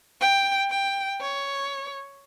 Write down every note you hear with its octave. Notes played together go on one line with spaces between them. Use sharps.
G5
G5
C#5